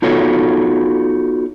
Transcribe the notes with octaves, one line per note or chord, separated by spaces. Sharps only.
B3 D#4 F4 F#4 A4 C#5